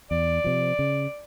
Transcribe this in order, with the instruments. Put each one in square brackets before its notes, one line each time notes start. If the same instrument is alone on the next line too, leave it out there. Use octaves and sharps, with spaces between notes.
[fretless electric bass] E2 [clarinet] D5
[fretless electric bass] C3 F3
C#3